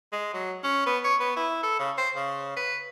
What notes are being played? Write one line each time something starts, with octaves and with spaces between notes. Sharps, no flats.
G#3
F#3
C#4
B3
C#5
B3
E4
A4
C#3
C5
C#3
B4